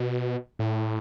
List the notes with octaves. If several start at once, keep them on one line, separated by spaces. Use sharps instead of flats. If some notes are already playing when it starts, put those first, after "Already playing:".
Already playing: B2
A2